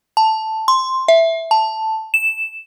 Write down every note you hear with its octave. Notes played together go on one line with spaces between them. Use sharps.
A5
C6
E5
A5
E7